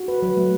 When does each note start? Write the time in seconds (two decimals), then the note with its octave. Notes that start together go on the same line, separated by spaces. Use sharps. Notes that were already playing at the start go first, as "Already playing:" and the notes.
Already playing: F#4
0.08 B4
0.22 F#3
0.37 A3